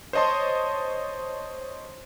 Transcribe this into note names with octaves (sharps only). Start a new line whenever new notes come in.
C5 C#5 D#5 A5 C6